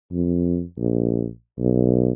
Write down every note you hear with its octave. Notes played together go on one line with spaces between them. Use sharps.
F2
A#1
B1